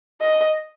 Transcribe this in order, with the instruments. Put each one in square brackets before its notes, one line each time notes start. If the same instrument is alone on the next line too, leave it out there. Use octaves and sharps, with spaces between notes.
[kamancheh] D#5